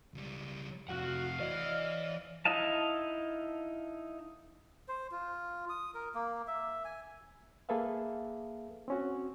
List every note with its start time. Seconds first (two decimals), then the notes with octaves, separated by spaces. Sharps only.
0.14 C#2 G3
0.89 F2 C3 F#4 F5 F#5
1.40 E3 D5 D#5
2.45 D#4 E4 D#5 F5 A5
4.88 C5
5.11 F4
5.69 D#6
5.94 A#4
6.15 A#3
6.47 E5
6.85 G#5
7.69 A#3 G#4 A4 B4 E5 F5
8.88 C4 C#4 F#4